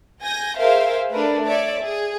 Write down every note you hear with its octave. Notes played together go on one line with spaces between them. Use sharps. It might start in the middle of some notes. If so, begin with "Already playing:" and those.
G#5 G6 A#6
G#4 A#4 C5 E5 F5
A3 D4 A#4 B4
C#5 D5 E5
G#4